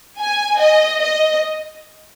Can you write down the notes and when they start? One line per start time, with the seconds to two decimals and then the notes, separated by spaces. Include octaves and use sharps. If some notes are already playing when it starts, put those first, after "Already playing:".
0.19 G#5
0.59 D#5
1.00 D#5